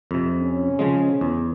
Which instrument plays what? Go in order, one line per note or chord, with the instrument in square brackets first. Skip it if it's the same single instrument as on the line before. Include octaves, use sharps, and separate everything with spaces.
[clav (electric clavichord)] F2 C3
[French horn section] C#4
[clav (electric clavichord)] C#3 F3 G#3
E2